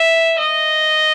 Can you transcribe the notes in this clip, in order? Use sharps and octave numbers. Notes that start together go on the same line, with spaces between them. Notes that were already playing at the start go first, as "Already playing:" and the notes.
Already playing: E5
D#5